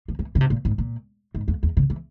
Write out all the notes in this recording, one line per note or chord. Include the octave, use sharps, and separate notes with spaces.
F3
E3
C#3
C3
A#2
G#2
A#2
G#2
F2
E2
C#3
E3